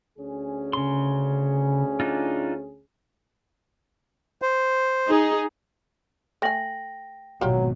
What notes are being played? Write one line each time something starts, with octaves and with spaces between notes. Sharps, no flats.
D2 C#4 G#4
C#3 C6
D4 D#4 F4
C5
D#4 G#4
A3 G5 G#5 A#6 F#7
G#1 B2 F#3 F4 G4